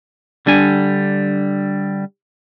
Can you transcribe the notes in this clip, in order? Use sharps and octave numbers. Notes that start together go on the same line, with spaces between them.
D3 G3 D4 G#5